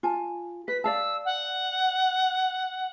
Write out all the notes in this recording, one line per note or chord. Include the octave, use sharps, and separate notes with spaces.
F4 G#5 A5
B4 B6
D5 F5 A5 E6
F#5